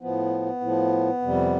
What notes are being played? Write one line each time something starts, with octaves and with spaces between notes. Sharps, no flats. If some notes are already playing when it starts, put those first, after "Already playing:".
A2 F3 B3
A2 F3
F2 C3 G3